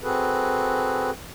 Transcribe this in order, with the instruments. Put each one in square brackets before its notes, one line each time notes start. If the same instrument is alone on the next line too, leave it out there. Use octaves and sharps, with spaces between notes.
[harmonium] C4 F#4 G#4 A4 B4